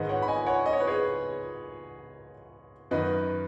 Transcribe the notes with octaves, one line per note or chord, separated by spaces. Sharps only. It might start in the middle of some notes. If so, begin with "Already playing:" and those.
Already playing: G#2 D#3 B4 D#5
C#5 F#5
B5
D#5 G#5
C#5 F#5
D#5
C#5
B4
G#4 C#5
F#2 D#3 B4 D#5